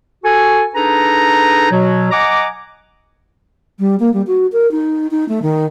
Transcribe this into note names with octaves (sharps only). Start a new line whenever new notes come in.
F#4 A4 G#5
D4 D#4 G#4 A4 B4 A#5
B2 F#3
D#5 F#5 G#5 A#5 D6
G3
A#3
G3
F#4
A#4
D#4
D#4
A3
D#3